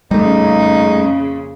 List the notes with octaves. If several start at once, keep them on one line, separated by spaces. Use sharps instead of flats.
F2 A#2 C#3 G3 A3 D#4